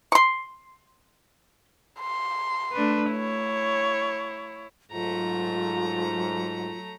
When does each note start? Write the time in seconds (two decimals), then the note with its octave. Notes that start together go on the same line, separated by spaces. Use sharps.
0.12 C6 C#6
1.99 C6
2.72 A3 D4 B4
3.11 E4 C#5
4.92 G#2 F#3 A3 F4 A#5